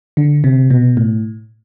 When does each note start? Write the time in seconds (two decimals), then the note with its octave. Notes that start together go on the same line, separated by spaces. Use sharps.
0.17 D3
0.44 C3
0.70 B2
0.97 A2